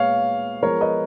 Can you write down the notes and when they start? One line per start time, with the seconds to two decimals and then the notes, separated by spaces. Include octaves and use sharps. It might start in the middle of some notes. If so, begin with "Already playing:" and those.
Already playing: A#2 G#3 B3 C#5 F5
0.63 F3 G#3 B3 A#4 C#5
0.81 B4 D#5